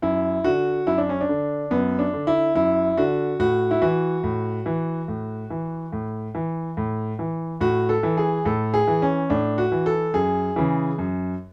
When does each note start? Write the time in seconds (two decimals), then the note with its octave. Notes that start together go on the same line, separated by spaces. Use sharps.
0.02 F#2 E4
0.44 D3 F#4
0.87 F#2 E4
0.98 D4
1.09 C#4
1.21 D4
1.29 D3
1.71 F#2 B3
1.99 D4
2.13 D3
2.27 E4
2.55 F#2 E4
2.97 D3 F#4
3.40 A2 F#4
3.71 E4
3.82 E3 F#4
4.23 A2
4.66 E3
5.08 A2
5.50 E3
5.92 A2
6.35 E3
6.77 A2
7.19 E3
7.61 A2 F#4
7.89 A4
8.03 E3
8.17 G#4
8.45 A2 A4
8.74 G#4
8.88 E3
9.02 C#4
9.30 A2 D4
9.58 F#4
9.72 E3
9.86 A4
10.14 F#2 G#4
10.56 C#3 E3
10.99 F#2